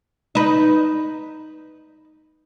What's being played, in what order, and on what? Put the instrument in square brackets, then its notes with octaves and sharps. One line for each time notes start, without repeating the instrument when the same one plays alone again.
[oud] D#4 B4